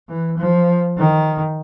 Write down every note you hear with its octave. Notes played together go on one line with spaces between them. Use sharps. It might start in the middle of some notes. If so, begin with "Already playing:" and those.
E3
F3
D#3